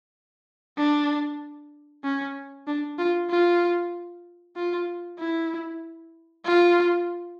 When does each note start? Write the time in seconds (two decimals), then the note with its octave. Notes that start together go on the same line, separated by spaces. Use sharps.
0.77 D4
2.04 C#4
2.67 D4
2.98 F4
3.30 F4
4.56 F4
5.19 E4
6.45 F4